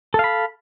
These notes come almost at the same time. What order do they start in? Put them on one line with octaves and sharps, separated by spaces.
A4 F5 B5